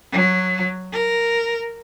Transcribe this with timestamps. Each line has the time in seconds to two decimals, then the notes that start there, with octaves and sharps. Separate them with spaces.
0.12 F#3
0.93 A#4